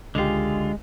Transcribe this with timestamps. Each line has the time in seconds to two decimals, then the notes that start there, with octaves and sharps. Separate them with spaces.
0.15 C#2 D3 G#3 F4 G4